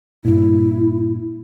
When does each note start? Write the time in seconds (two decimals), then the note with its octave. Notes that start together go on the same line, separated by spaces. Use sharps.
0.25 G2 A#2 E4